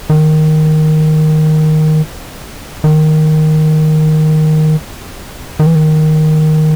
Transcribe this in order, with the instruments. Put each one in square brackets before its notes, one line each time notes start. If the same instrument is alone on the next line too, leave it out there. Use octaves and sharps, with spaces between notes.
[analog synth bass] D#3
D#3
D#3
E3
D#3